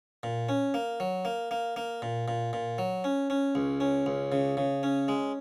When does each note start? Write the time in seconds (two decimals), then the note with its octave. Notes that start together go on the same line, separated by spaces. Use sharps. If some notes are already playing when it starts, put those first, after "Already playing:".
0.23 A#2
0.49 C#4
0.74 A#3
1.00 F#3
1.25 A#3
1.51 A#3
1.76 A#3
2.02 A#2
2.28 A#2
2.53 A#2
2.78 F#3
3.04 C#4
3.30 C#4
3.55 C#2
3.80 C#4
4.06 C#2
4.32 C#3
4.57 C#3
4.83 C#4
5.08 G#3